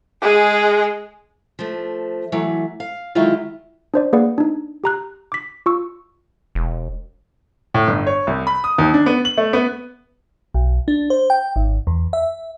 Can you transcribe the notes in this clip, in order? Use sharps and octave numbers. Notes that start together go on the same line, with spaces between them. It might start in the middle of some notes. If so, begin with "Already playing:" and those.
G#3 G#4
F3 A3
E3 F#3 A3
F5
D3 D#3 F#3 G#3 E4 F4
D4 C5 D5
A#3 G#4 B4 D5 F#5
D4 D#4
G4 A#5 F#6
D6 B6
F4 C#6 E6
E1
A2
G1
C#5
C2
B5
D#6
D#2
D4
B3
F#7
A3
B3
B1
D4
C5
G5
G#1
E2
E5